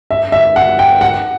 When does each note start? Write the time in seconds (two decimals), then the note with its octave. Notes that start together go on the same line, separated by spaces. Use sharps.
0.11 E5
0.32 E5
0.56 F#5
0.79 G5
1.01 F#5